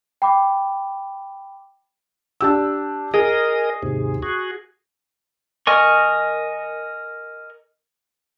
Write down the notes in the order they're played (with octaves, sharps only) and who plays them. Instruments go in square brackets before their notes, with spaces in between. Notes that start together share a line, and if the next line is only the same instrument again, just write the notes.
[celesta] G5 B5 D6
[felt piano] D4 G4 E6
[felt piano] G#4 [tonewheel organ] A#4 D#5
[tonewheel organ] D#2 G#2 C3
F#4 G#4
[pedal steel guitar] A#4 D#5 G#5 C#6